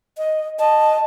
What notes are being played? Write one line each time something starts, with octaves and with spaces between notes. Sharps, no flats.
D#5
D#5 A5